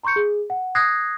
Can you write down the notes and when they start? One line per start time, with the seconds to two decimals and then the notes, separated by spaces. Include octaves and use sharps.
0.03 A#5 C6 C#6 G6 C#7
0.16 G#4
0.50 F#5
0.75 D#6 F#6 G#6 A#6 C7